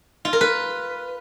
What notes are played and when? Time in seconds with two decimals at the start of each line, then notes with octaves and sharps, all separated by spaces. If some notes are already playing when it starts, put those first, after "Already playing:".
0.25 F4
0.33 A#4
0.41 B4